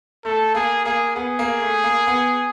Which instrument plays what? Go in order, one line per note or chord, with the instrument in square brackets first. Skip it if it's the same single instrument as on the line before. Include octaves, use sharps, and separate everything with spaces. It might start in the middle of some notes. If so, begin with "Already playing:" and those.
[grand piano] A3 [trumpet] A4
[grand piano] A#3 [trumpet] G#4
[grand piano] A#3 [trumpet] G#4
[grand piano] B3 [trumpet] G#4
[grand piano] A#3
A3
A#3
B3